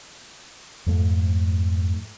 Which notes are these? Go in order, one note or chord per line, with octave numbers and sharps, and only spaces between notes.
F2 G#2 A3